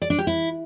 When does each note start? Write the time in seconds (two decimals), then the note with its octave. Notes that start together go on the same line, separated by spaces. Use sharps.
0.02 D5
0.10 D4
0.19 G4
0.27 E4